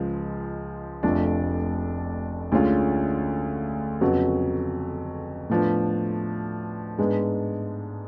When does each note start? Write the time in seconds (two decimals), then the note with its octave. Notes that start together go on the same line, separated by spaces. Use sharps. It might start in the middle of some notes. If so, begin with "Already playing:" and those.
Already playing: C#2 C#3 F3 G#3
1.03 F1 F2 F3 A3 D4
2.52 D2 D3 G#3 C#4 F4
4.01 F2 C#3 F#3 B3 F#4
5.49 A2 F3 B3 D4
6.98 G#2 G#3 B3 D4